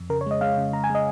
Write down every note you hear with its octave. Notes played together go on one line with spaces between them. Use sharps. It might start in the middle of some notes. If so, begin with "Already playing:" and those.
Already playing: F2
C#3 A#4
C#5
G#3 D#5
G#3 F5
C#3
C#3 A#5
G#5
G#3 D#5